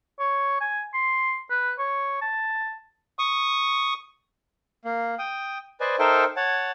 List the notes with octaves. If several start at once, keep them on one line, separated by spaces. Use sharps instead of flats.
C#5
G#5
C6
B4
C#5
A5
C#6 D#6
A#3
G5 D#6
B4 C5 D5 D#5 G#5
D#4 A4 A#4 C5 E5 G5
C#5 F#5 A5